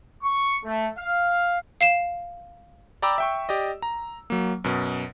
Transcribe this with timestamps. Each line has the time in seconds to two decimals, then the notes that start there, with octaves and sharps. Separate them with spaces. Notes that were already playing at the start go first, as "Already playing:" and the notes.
0.23 C#6
0.64 A3
0.98 F5
1.81 F5 C7 E7
3.02 D5 G5 A#5 B5 D6 E6
3.18 E5 G5 C#6
3.49 G4 D5 D#5
3.82 A#5
4.30 F#3 A#3
4.64 F#2 B2